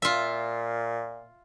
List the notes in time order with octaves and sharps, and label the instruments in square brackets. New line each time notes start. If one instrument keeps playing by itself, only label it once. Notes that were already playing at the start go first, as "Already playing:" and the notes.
[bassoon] A#2 [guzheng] F4 E5